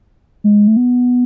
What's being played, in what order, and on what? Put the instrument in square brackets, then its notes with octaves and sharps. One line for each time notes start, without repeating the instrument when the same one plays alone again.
[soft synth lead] G#3
A3
B3